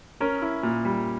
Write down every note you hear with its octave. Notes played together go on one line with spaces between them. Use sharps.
C#4 A#4
E4
A#2
G3